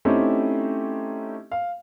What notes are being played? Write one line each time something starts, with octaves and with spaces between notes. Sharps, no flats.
A3 C4 C#4 D#4 E4 G4
F5